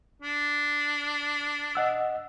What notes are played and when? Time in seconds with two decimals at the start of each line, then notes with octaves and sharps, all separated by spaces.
0.22 D4
1.75 D#5 F#5 E6